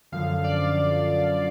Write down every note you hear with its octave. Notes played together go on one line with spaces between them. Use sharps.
F#2 D3 F3 F5
D5